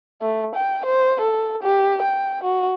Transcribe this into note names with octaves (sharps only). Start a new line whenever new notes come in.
A3
G5
C5
A4
G4
G5
F#4